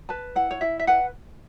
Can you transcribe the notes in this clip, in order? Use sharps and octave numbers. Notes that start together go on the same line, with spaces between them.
B4 A5
E4 F#5
C#5
E4 E5
E5
B4 F#5